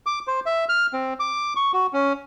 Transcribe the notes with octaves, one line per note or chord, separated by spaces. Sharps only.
D6
C5
E5
F6
C4
D6
C#6
F#4
C#4